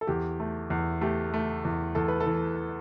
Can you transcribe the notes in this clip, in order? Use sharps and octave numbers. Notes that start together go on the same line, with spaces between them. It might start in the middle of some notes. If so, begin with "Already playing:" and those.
A4
E2 G4
A3
E2
A3 G4
A3
E2
E2 A4
B4
A4
E3